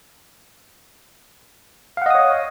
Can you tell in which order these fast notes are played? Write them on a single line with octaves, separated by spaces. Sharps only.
F5 F#5 D#5 D#6 C#5